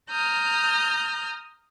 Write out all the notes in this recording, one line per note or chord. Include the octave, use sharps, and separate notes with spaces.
A#5 D#6 F6 G6